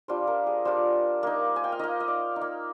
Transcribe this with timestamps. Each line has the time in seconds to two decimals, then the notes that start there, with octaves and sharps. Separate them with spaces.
0.08 G3 D4 F4 C5
0.27 A#4
0.47 G#4
0.65 G3 D4 F4 C5
1.23 A#3 D#4
1.56 G#5
1.64 G5
1.72 F5
1.79 A#3 D#4 D#5
2.00 D#5
2.08 D5
2.36 D#4
2.41 A#3